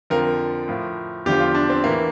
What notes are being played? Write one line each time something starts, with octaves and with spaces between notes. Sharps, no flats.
F2 D3 F3 A#4
A2 F3
E2 D3 F3 G4
F4
D4
C4
A2 E3 A#3